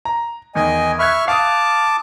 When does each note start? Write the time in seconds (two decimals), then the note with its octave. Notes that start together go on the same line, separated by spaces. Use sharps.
0.05 A#5
0.55 E2 D#3 D#5 G#5
0.99 E5 B5 C#6 F6 F#6 G#6
1.28 F5 A5 D6 D#6